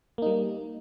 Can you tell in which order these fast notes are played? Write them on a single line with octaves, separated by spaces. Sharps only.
A#3 D#4 G3